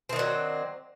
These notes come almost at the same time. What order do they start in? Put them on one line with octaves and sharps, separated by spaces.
C4 D#3 D4 F#3